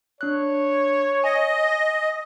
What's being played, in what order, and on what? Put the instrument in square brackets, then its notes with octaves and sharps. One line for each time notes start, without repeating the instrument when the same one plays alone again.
[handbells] D4 F#6 [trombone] C#5
[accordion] D#5 [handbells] G#5